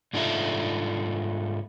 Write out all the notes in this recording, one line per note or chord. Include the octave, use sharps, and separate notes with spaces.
G#2 D4 D#4 F4 A4 E5